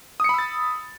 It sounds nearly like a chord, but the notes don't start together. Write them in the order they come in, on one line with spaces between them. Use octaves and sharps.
D#6 C#7 B5 E6 A6